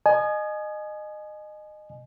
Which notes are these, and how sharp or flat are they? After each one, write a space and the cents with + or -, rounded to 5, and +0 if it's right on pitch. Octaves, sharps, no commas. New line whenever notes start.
D#5 -25 G#5 +20